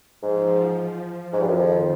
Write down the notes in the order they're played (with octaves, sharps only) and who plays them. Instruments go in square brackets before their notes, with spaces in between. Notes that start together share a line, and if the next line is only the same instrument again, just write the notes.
[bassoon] G#2 [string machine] F3
[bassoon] G#2
G2
F#2
[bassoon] F2 [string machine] D#3